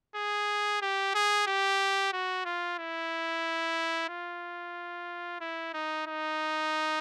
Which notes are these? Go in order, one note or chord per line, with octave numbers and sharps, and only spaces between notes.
G#4
G4
G#4
G4
F#4
F4
E4
F4
E4
D#4
D#4